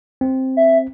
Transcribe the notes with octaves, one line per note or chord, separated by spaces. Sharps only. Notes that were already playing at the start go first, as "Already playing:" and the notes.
C4
E5